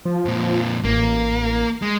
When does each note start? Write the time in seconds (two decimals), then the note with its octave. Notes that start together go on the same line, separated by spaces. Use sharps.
0.05 F3
0.25 F2 A#2
0.84 A1 A#3
1.82 G#3